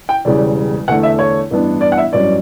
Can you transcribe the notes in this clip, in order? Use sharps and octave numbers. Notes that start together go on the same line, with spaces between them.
G5
E1 E2 C#3 G3 D5
E2 D3 A3 F#5
E5
C#5
A1 G2 E3 B3 D4
D5
F#5
E5
A1 G2 F#3 C#4 D5